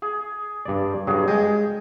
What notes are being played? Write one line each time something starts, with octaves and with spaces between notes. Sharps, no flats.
G#4
G2 D5
G2 F#3 G#4
G#3 D#5 G5 G#5